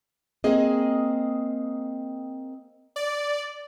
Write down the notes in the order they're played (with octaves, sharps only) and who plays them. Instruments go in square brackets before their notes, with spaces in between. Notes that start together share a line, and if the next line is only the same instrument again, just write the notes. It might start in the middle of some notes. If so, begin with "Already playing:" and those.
[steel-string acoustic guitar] A#3 C4 G#4 D#5
[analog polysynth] D5